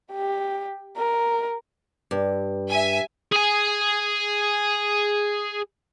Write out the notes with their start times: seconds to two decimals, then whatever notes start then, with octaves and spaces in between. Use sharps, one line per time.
0.13 G4
0.97 A#4
2.11 G2
2.69 E5 G#5
3.32 G#4 G#5